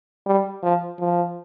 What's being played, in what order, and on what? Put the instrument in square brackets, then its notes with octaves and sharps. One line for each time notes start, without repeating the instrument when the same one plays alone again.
[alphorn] G3
F3
F3